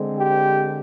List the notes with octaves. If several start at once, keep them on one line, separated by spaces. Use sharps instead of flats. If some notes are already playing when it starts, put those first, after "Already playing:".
Already playing: D3 G#3 C4
G4